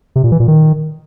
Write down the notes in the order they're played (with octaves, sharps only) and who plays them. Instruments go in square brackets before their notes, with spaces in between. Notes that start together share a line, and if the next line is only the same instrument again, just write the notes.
[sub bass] C3
A#2
E3
A#2
D#3